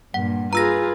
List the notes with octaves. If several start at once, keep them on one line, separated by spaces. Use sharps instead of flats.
G2 A#2 F#5
F4 G#4 B4 A#5 E6 A#6